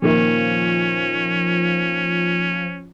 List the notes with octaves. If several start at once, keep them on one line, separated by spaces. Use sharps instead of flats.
A#2 D#3 F3 A#3 C#4